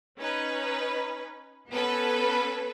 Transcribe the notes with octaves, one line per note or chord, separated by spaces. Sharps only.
C#4 D#4 B4
B3 C#4 A4 B4